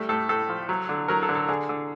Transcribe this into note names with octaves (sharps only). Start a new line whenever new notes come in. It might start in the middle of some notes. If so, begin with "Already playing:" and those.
Already playing: G3 A3
A2 A4
A2 A4
F3
F#3
D3
F#3 A#4
A4
D3
A4
D3 G#4
D3